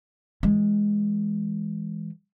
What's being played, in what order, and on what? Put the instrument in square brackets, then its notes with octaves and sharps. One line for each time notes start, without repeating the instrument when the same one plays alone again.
[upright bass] E3 G#3